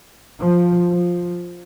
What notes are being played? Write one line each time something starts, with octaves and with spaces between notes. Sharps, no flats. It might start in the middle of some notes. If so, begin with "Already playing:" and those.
F3
F3